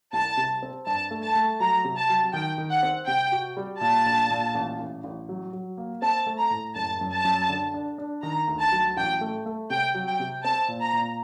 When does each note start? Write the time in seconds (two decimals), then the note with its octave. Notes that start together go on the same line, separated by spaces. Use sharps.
0.13 C2 A5
0.37 C3
0.63 C4
0.87 G2 A5
1.11 A3
1.23 A5
1.35 A3
1.60 F#3 A#5
1.85 C3
1.97 A5
2.09 F#3
2.33 D#3 G5
2.58 D#3
2.71 F#5
2.83 C4
3.07 C3 G5
3.32 F#4
3.57 G3
3.81 A#2 A5
4.06 A#1
4.30 A#2
4.55 A1
4.79 A1
5.04 A1
5.29 F#3
5.53 F#3
5.77 A#3
6.02 C4 A5
6.26 A3
6.39 A#5
6.51 A2
6.75 F#1 A5
7.01 F#2
7.12 A5
7.25 F#2
7.50 D3
7.74 D4
7.98 D4
8.23 D#3 A#5
8.48 D2
8.60 A5
8.72 F#3
8.97 A1 G5
9.21 A3
9.46 A3
9.70 C3 G5
9.94 F#3
10.07 G5
10.20 C3
10.44 C4 A5
10.68 A#2
10.81 A#5
10.93 A#2